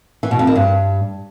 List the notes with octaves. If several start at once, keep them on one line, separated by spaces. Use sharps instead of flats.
E3
B2
F2
D#3
G2